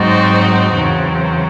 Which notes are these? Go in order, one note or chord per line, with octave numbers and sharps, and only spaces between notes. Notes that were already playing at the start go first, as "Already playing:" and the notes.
Already playing: G#2 F#3 C4 D#4 F#4
E2 C#3 F#3 C4